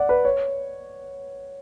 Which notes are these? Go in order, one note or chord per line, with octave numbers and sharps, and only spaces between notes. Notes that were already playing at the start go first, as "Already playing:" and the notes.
Already playing: D5 F#5
B4
C#5